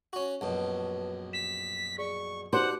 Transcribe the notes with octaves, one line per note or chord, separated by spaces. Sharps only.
C#4 F#4
A#1 F#2 B2 B4 A5
B6 E7
G#4 D5 C#6
D4 D#4 F#4 G4 C5 F#5